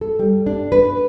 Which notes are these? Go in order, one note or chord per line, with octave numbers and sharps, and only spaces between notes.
A4
G3
D4
B4